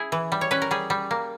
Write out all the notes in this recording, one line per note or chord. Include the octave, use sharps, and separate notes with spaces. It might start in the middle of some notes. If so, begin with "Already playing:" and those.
Already playing: E4 G#4
E3
G3
C#5
C#4 B4
A#4
G3 G#4
G3
A#3